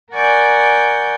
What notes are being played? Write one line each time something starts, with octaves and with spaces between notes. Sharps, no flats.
A#4 D5 F#5 G#5 C#6 G6